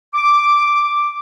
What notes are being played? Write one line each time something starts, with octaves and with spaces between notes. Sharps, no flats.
D6